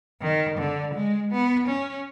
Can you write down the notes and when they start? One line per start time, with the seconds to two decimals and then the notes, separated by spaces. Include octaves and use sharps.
0.21 D#3
0.58 D3
0.94 G#3
1.31 B3
1.68 C#4